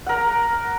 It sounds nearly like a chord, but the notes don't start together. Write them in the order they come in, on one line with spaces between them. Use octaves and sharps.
F#5 A#4 A#5